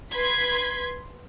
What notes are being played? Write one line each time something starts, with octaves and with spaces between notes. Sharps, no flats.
B4 C6 G#6 B6